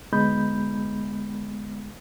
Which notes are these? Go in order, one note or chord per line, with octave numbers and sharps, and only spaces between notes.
D2 G#3 B3 D#4 B5 G6